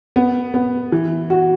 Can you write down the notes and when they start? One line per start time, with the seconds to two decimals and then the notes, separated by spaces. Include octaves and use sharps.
0.16 B3
0.54 B3
0.92 E3
1.30 F#4